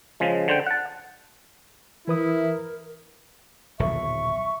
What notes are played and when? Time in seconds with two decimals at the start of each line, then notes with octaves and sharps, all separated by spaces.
0.20 C#3 F3 G#3
0.48 D3 C5 G5
0.67 F#5 A5
2.08 E3 E4 A#4 B4 D#6
3.79 D#1 B1 D3 E5 C#6